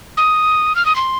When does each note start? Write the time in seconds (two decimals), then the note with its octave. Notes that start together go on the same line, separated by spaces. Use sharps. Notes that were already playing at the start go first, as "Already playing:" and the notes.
0.17 D#6
0.75 F6
0.85 D#6
0.96 C6